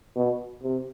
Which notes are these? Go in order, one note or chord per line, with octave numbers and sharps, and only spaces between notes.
B2
C3